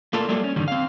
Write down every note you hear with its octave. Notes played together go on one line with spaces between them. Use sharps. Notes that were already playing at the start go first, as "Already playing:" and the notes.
A3 A#3 F4 A4 A#4 D5
F#3 G3 A3 A#3 A4 D5
C#4
G2 D3 D#3 G3
C4 F5